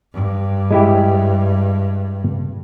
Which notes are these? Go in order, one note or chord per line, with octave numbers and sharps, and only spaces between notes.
G2
G#3 E4 G4